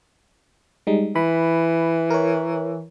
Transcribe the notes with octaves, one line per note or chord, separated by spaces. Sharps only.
G3 G#3 D#4
E3 B5
A#4 C#5